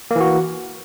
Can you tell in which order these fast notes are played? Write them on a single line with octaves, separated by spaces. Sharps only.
A#3 E3 F#4